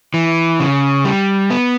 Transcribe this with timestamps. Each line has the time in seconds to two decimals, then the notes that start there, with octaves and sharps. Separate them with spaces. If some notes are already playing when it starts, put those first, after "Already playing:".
0.14 E3
0.60 C#3
1.05 G3
1.51 B3